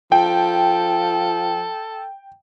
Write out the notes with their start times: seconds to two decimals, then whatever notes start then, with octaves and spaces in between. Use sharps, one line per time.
0.12 F3 A4 G5